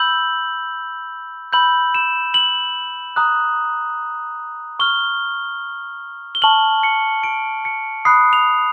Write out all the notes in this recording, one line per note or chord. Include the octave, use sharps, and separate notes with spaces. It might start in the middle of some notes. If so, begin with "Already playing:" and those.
Already playing: B5 E6 G6 F#7
B5 E6 G6 F#7
E7
F#7
A#5 D#6 F#6
C#6 F6 G7
G7
A5 C#6 F6 F#7
C#7
D7
C#7
B5 D#6 F#6 C7
F7